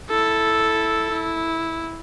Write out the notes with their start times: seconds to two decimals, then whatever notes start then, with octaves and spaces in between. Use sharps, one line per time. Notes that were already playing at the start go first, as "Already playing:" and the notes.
0.10 E4 A4
1.12 E4